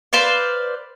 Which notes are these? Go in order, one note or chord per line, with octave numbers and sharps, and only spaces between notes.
B4 C5 D5 F5